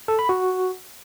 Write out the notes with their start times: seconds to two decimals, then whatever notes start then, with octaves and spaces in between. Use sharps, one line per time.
0.08 A4
0.19 B5
0.29 F#4